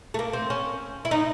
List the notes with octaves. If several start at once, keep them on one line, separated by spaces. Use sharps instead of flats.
A3
A#3
C4
C#4
E4
D#4